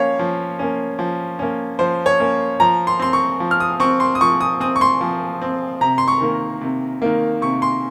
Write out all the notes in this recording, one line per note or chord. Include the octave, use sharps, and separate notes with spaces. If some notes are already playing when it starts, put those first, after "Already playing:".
Already playing: F3 A#3 C#4 C#5 F5
F3
A#3 C#4
F3
A#3 C#4
F3 C5
C#5
A#3 C#4
F3 A#5
C6
C4 C6
C#6
F3
F6
D#6
C4 C#6
C6
D#6
F3 C#6
D#6
C4 D#6
C#6
C6
F3
C4
C3 A#5
C6
C#6
D#3 A#3
C3
D#3 A#3
C3 C#6
C6